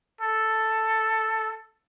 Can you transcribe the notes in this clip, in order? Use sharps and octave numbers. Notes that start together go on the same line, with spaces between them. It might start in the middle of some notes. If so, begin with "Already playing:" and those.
A4